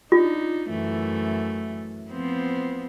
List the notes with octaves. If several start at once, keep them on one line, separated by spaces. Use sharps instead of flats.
D4 D#4 F4
F#2 E3 A3
F3 B3 C4